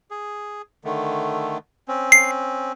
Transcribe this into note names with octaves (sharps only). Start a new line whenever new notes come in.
G#4
D3 D#3 A3
C4 C#4
C7